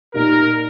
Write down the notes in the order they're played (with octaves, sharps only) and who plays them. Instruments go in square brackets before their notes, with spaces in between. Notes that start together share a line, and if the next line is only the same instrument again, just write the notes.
[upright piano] A#2 A#3 D#4 G4 [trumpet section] A#4